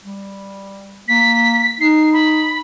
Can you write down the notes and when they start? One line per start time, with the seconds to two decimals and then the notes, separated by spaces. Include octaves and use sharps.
0.02 G3
1.08 A#3 B6
1.80 D#4 C7
2.13 B5